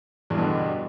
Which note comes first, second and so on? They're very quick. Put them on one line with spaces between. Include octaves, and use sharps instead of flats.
E2 G2 B2 D3